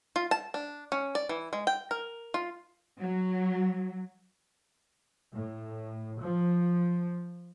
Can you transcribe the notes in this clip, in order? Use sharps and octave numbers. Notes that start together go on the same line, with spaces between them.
F4
A5
D4
C#4
D5
E3
G#3
G5
A#4
F4
F#3
A2
F3